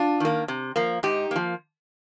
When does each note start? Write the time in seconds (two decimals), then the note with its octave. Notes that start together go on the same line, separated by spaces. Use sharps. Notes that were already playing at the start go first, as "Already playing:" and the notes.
Already playing: D4 F4
0.20 D#3 A#3
0.48 C3
0.76 F3 A#3
1.03 G#2 D#4 G4
1.31 F3 A#3